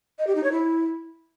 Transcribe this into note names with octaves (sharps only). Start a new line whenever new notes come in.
D#5
G4
D#4
C#5
E4